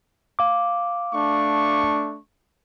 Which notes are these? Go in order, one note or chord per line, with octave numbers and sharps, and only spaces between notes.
F5 D6
A3 D4 C#6